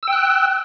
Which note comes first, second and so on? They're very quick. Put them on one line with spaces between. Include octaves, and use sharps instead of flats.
E6 G5 F#6